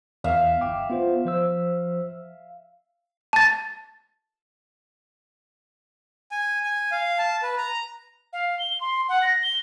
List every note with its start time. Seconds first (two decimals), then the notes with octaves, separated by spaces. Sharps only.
0.24 E2 E5 F5
0.61 G1 G5 D6
0.90 B3 F4 C5
1.25 F3 C5 E6
3.33 A5 A6
6.32 G#5
6.63 G#5
6.92 F5
7.18 A5
7.43 B4
7.58 A#5
8.33 F5
8.59 G7
8.80 C6
9.09 F#5
9.22 A#6
9.43 G7